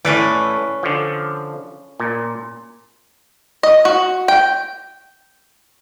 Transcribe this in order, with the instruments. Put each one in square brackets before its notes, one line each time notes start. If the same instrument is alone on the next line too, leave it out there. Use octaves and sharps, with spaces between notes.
[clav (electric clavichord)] A2 E3 [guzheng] C#4 B4 D5
[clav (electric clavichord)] D3 F3
A#2
[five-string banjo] D#5
F#4
G5